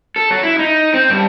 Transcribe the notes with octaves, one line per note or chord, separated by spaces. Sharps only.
A4
F#3
E4
D#4
C4
G2